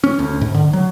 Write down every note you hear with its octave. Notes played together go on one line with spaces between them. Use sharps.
C#4
D2
G#2
D3
F#3